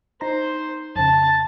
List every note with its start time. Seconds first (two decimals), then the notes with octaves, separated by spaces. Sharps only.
0.21 D#4 C5 A#5
0.96 F2 C#3 A5